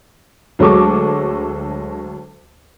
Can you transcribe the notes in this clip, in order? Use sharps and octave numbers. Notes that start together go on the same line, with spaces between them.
D2 F#3 G#3 A4 C#6 D6